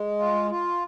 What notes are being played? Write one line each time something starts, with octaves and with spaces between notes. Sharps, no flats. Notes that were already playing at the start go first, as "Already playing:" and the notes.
Already playing: G#3
F4
F4